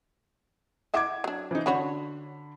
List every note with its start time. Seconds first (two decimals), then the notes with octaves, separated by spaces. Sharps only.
0.94 E4 D#5 E5 F#5 D6 G#6
1.24 F#3 D4
1.51 E3 D#4
1.66 D3 D4 F#4 C#5 B5